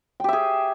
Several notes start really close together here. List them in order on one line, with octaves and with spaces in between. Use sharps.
G5 G4 E5 G#4